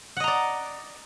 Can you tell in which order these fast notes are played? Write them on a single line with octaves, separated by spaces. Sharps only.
F#5 D#5 A#5 D5